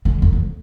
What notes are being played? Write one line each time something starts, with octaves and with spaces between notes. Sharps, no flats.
D3
F2
F2